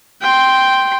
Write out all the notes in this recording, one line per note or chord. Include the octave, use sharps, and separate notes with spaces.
G5 C6